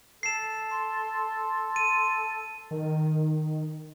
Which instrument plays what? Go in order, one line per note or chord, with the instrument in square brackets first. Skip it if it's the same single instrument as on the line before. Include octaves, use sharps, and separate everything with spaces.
[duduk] A4 [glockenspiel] C7 E7
[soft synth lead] C6
[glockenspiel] D#7
[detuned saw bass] D#3